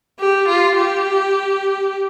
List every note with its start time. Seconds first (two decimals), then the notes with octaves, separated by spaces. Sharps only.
0.20 G4
0.48 F4
0.76 G4